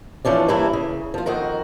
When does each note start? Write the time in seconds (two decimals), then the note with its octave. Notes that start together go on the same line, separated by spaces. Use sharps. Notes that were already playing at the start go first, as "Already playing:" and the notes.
0.25 E3 F3 C#4 D4
0.48 G2 E3 A#3 E4
0.73 C#3
1.14 F3 F4
1.26 F2 D#3 F#4 A#4